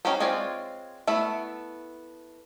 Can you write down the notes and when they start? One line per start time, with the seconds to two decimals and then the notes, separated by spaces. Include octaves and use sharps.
0.05 C#4 D#4 F#4 G4 C5
0.20 G#3 C4 F4 C#5 D5
1.07 A3 B3 E4 E5